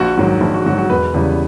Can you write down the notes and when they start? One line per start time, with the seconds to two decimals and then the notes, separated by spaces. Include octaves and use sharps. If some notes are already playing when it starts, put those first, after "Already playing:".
Already playing: A#1 F#4
0.17 G#2 D#3 F#3
0.41 A#1
0.54 F#4
0.66 G#2 D#3 F#3 F#4
0.78 F#4
0.90 E1 B4
1.14 E2 C#3 E3 G3